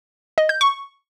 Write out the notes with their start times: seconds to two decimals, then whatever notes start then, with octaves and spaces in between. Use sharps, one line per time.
0.38 D#5
0.49 G6
0.61 C#6